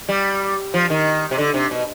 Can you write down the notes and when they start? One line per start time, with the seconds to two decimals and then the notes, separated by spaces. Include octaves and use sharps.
0.09 G3
0.74 F3
0.90 D#3
1.31 C3
1.38 D3
1.54 C3
1.71 B2